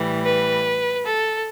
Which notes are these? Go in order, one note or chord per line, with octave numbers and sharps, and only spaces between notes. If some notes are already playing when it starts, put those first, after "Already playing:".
Already playing: A2 E3 G3
B4
A4